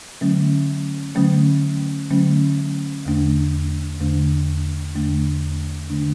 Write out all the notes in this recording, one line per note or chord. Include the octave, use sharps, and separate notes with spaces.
D3 F#3 A3 C#4
D3 F#3 A3 C#4
D3 F#3 A3 C#4
E2 D3 A3 D4
E2 D3 A3 D4
E2 D3 A3 D4
D3 A3 D4